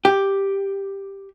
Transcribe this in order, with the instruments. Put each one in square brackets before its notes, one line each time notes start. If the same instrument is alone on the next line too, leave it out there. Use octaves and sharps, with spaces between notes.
[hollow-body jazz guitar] G4